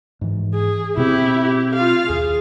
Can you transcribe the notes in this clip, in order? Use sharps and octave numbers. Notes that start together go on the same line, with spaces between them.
G#2 E3
G#4
B2 C4 E4 G4
G4
F4 F5
D#2 G#4